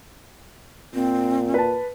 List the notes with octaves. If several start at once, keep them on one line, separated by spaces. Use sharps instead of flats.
A#2 C4
B4 A5